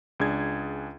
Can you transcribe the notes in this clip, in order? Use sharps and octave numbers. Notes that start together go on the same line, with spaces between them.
C#2 D4 G#4 G#6